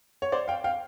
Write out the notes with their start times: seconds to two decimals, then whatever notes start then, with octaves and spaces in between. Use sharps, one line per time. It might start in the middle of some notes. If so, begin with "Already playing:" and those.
0.22 C#5
0.32 C5 D5
0.48 F5 G5
0.64 F5 G5